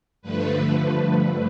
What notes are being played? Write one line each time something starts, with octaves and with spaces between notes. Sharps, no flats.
G2 D3 F3 A3 B4